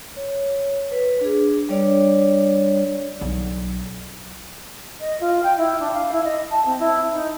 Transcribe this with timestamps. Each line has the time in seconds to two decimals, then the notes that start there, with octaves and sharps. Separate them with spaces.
0.16 C#5
0.91 B4
1.21 D4 G#4
1.69 G3 D4 C#5 D5
3.21 B1
5.00 D#5
5.20 F4
5.43 G5
5.57 E4
5.80 D4
5.94 F5
6.11 E4
6.24 D#5
6.50 A5
6.65 C4
6.79 E4
7.11 D#4